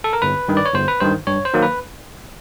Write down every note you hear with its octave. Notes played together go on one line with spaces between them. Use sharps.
A4
A#4
G1 B4
G2 D#3
D5
C#5
G1 C5
B4
G2 D#3 C5
G2 C#5
C5
D#3 F#3 A#3
B4